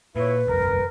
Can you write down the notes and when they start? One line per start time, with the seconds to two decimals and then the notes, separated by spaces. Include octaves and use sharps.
0.16 A#2 E4 B4 C#5
0.47 F#1 B1 E2 A#4